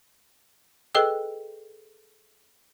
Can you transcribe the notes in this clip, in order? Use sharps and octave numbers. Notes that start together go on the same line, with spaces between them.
G#4 A4 B4 D#5 G5 E6